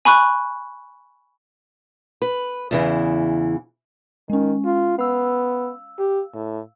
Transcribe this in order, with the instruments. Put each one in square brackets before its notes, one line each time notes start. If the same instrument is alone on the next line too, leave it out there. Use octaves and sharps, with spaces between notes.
[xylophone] G#5 B5 C#6 F#6
[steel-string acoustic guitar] B4
E2 C#3 E3
[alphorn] D#3 [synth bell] G#3 C#4
[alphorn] F4
[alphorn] B3 [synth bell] F5 E6
[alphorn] G4
A2